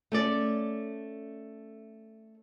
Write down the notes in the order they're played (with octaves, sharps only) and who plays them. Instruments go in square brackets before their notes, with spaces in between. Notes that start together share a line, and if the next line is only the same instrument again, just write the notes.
[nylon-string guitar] A3 C#4 D5